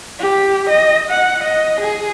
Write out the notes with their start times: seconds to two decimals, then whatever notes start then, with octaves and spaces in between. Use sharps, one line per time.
0.20 G4
0.70 D#5
1.10 F#5
1.44 D#5
1.81 G#4